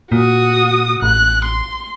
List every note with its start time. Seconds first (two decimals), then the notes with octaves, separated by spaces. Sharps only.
0.12 A#2 F#4 D#6
1.02 A1 F#6
1.45 C6